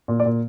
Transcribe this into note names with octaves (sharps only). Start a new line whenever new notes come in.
A#2
D5
A#2